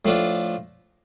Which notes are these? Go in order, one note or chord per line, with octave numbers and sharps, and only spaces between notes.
A2 F3 A3 D4 F4